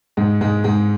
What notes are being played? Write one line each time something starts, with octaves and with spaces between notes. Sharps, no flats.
G#2 G#3
G#2 G#3
G#2 G#3